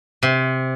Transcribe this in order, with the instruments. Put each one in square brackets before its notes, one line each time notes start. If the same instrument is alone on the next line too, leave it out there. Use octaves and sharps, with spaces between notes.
[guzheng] C3